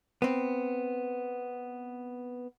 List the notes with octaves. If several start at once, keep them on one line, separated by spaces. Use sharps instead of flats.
B3 C4